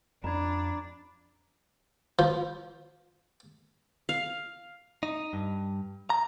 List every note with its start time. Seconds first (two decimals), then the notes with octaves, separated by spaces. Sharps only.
0.24 F2 D4 A#5 B5 G#6
2.19 F3
4.09 F5
5.03 D#4
5.33 G2
6.10 A#5